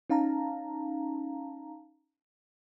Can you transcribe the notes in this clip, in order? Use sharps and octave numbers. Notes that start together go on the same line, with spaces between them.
C#4 D#4 F5 A5 A#5